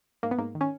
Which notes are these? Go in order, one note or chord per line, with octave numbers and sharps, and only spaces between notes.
G#2 A#3
B3
G#2 A#3
D#3
C#4